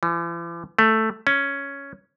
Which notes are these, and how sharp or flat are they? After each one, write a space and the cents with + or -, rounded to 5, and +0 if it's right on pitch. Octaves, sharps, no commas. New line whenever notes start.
E3 +45
A3 +5
C#4 +5